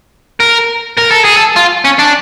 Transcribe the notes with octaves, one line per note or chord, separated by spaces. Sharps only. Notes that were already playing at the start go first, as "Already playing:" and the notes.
A#4
A#4
A4
G#4
A4
F4
C#4
D4